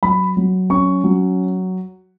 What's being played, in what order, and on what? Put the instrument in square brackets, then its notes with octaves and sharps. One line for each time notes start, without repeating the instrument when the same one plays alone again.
[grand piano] F#3 B5
F#3
C#4 C#6
F#3